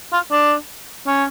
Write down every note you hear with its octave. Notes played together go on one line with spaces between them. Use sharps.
F4
D4
C#4